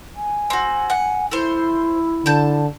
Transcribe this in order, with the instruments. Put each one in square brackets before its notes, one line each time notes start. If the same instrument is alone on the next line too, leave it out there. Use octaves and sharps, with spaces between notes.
[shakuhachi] G#5
[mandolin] C4 F#4
F#5
[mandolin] A3 C5 [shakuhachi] E4
[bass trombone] D3 [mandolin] A5 G6